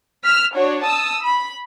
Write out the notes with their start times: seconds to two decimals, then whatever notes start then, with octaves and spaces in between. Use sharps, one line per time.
0.24 E6 F6 B6
0.54 D4 F#4 C#5
0.84 A5 D#6 E6
1.24 B5